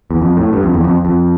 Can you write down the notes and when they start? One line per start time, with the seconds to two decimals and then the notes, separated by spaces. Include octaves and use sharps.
0.11 E2
0.22 F2
0.37 A2
0.53 G2
0.64 F2
0.74 E2
0.84 F2
1.05 F2